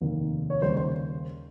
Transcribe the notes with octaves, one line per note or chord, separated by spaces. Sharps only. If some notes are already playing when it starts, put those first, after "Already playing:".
F1 D#2 D#3
C#5
D#2 C#3 G3 C#4 C5
C5